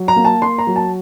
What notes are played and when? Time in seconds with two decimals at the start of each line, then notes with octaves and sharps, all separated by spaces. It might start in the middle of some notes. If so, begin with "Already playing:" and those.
Already playing: F#3
0.08 A#5
0.16 A#3
0.25 A5
0.42 A#3 C6
0.58 A#5
0.67 F#3
0.76 A5